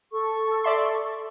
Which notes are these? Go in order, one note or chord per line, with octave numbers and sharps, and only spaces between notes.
A4 C#6
D5 E5 C6